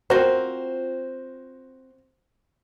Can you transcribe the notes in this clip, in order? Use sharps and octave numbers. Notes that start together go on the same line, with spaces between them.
C4 F4 F#4 A#4 C5